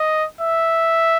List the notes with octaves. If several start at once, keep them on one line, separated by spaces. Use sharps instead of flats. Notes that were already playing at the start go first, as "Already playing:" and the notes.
Already playing: D#5
E5